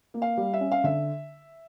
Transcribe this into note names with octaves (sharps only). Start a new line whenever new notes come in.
A#3
F5
G3
E5
C#4
F5
D3 E5